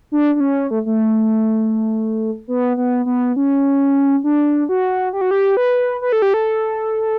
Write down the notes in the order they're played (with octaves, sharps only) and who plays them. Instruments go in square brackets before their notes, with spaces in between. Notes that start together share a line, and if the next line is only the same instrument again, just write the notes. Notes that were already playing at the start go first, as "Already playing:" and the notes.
[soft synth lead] D4
D4
C#4
A3
A3
B3
B3
B3
C#4
D4
F#4
G4
F#4
G4
B4
B4
A4
G4
A4